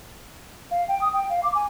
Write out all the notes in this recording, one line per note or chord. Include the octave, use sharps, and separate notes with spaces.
F5
G5
D#6
G5
F5
D6
G#5